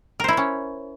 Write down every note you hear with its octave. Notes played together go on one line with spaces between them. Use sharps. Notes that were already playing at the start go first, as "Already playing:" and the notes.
C#4 E4 A#4 C5 E5